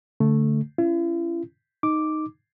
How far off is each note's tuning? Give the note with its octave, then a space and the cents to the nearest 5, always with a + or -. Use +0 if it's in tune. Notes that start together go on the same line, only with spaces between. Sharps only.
D3 -35 A3 +0
C#4 +5 E4 +45
D#4 +0 D6 +0